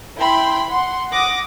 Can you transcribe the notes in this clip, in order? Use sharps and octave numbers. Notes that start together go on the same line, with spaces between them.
E4 G5 B5 C6
F#5 C6
F#5 D6 D#6 A#6